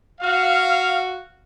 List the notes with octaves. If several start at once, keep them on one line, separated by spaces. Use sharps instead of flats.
F#4 F5